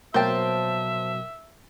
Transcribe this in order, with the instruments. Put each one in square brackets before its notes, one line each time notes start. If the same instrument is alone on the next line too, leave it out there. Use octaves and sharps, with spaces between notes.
[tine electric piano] B2 F#3 [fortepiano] A#3 G5 [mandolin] C5 A5 [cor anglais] E5